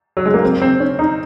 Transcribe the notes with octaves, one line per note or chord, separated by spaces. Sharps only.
F#3
G#3
A#3
C4
C4
C#4
D#4